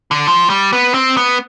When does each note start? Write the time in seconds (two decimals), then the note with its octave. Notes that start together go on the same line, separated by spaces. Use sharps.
0.11 D3
0.27 F3
0.50 G3
0.73 B3
0.94 C4
1.17 B3